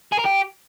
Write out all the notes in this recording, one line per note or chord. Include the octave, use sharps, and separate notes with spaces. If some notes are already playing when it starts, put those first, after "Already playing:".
G#4
A#4
G4